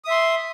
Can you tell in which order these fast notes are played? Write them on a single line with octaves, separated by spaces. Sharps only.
D#6 E5 C6